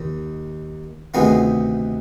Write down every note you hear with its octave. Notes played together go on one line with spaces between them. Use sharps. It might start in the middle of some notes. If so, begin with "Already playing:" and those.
Already playing: D#2 D#3
D2 C3 D#3 B3 D#4 F4 G#4